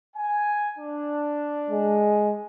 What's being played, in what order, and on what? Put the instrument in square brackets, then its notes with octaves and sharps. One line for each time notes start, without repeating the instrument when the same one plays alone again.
[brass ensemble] G#5
D4
[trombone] G#3